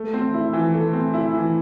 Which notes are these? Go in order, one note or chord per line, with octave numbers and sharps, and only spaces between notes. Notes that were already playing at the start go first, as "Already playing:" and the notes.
Already playing: A3
C4
E4
E3
A3
C4
E4
E3